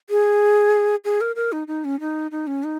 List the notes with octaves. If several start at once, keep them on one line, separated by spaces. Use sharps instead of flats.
G#4
G#4
A#4
A#4
D#4
D#4
C#4
D#4
D#4
C#4
D#4